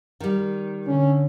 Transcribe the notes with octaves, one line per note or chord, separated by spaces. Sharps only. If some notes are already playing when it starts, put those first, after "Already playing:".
D#3 G3
D3 C#4